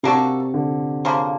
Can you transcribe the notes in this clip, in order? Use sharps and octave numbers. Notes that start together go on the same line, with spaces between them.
C3 A#3 D4 F#4 A4
D3
C#3 F3 A#3